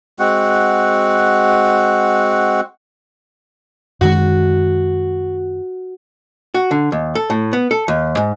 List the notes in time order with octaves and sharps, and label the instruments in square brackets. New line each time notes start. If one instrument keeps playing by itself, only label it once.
[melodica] G#3 C4 F#4 F#5
[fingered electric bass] F#2 D#3 G#3 [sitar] F#4
[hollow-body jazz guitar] F#4
D3
D#2
A4
A2
B3
A4
D#2
G#2